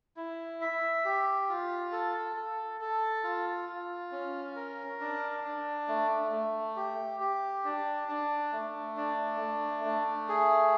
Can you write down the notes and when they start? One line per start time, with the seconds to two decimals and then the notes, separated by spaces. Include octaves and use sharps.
0.17 E4
0.61 E5
1.05 G4
1.49 F4
1.92 A4
2.36 A4
2.81 A4
3.24 F4
3.69 F4
4.12 C#4
4.56 A#4
5.00 D4
5.44 D4
5.88 A3
6.32 A3
6.76 G4
7.20 G4
7.65 D4
8.08 D4
8.52 A3
8.97 D4
9.41 A3
9.84 A3
10.29 G#4